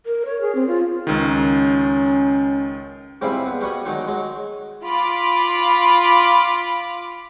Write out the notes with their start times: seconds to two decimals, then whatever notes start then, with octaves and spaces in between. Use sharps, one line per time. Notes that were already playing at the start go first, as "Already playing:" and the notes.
0.06 A#4
0.25 C#5
0.41 G#4
0.55 C4
0.68 F4
1.07 C#2 D#3 C#4
3.21 G#2 C#3 G3 C4 E4 F4
3.46 B3
3.61 G3 F#4 C#5 D#5
3.86 D#3 F#3 G#3 D#4
4.07 F#3 G#3
4.84 F4 B5 D6